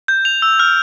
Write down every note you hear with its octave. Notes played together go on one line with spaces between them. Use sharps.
G6
F7
E6
F6